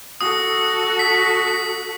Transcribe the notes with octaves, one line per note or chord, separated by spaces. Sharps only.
F#4 A4 D#6
B6